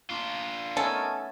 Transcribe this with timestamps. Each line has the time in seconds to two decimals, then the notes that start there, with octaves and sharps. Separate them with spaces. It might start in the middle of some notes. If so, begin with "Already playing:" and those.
0.10 D4 F4
0.77 A3 B3 C#4 D#4 A4 A#4 G#5